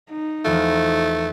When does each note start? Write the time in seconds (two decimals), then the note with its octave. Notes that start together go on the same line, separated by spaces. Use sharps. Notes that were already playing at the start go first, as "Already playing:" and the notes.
0.11 D#4
0.45 E2 F3 A3 F4